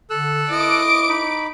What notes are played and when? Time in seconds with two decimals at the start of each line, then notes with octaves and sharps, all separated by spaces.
0.10 D3 A4 E6 F#6
0.50 E4 D#5 D6 D7
1.09 D#4 B5